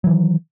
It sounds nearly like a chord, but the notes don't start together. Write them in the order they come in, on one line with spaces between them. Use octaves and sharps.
F#3 E3 D#3